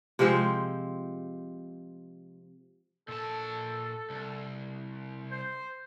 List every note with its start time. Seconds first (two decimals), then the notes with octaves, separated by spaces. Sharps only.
0.19 C3 F3 G#3 C4
3.08 A#2 A4 A5
4.10 C2
5.32 C5